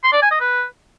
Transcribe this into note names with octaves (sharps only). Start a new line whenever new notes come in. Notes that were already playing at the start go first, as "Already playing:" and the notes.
C6
D5
G#5
D#5
B4